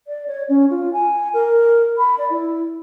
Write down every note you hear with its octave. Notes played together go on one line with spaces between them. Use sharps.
D5
C#5
C#4
F4
G#5
A#4
B5
D5
E4